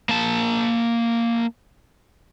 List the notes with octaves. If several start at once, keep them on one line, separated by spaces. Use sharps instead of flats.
A#3 A5